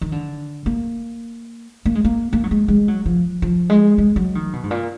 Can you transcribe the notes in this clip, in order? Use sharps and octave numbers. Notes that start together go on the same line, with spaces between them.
D#3
D3
A#3
A#3
G#3
A#3
A#3
F#3
G#3
G#3
F#3
F3
F3
G#3
G#3
F#3
D#3
B2
G#2
A#2